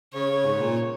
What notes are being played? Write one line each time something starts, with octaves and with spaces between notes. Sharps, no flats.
C#3 C#5
C#3
G#2
A#2